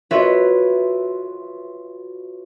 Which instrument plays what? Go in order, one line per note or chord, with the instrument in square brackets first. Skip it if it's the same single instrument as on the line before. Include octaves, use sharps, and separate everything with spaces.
[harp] F4 F#4 B4 C#5 E5